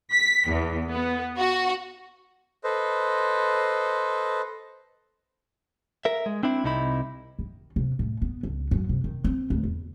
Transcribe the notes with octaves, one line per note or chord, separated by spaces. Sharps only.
B6
E2
B3
F#4
A4 B4 C5 D#5
A#4 E5
G#3
C4 D4 E4
C2 C3 D#4 E4 B5
D#3
C3
A2
B3
C#2
F#2
C3
D#3
C4
D2
E2